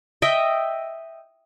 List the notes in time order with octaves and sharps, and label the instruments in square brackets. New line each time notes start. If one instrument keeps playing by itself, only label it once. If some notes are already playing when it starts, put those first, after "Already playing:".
[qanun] D#5 E5 G5